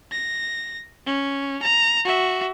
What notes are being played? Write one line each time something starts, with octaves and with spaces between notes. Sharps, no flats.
A#6
C#4
A#5
F#4 E5